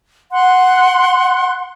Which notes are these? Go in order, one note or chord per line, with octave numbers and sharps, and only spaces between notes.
F#5 C6 F#6